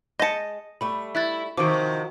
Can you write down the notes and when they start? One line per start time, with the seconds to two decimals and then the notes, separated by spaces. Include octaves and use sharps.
0.20 G#3 D#5 A5 G6 B6 C#7
0.81 G3 A3 B5
1.15 E4 E5 F#6 A6
1.57 C3 D#3 F3 F#4 D6 D7